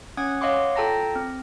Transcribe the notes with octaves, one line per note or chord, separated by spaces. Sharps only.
C#4 F#5 D#6 F#6 G#6
C#5 D#5 F5 F#5 C6 D6
F4 A4 G5 A5 A#5 A#6
C4